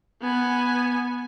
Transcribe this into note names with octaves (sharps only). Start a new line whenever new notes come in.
B3 G#5